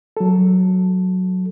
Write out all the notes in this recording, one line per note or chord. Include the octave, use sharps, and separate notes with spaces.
F#3 A4